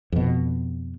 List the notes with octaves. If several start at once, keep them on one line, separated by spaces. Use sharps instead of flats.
F2 B2